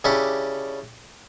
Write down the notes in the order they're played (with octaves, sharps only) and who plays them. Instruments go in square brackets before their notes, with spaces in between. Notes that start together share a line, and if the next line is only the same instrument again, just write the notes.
[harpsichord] C#3 C#4 D4 E4 G4